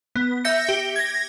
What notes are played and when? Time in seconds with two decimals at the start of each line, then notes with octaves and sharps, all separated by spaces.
0.15 B3
0.44 E5 G6 A#6 C#7
0.69 G4
0.96 G#6 A#6